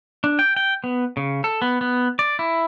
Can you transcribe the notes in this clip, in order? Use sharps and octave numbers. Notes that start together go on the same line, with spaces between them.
D4
G5
G5
B3
C#3
A4
B3
B3
D5
E4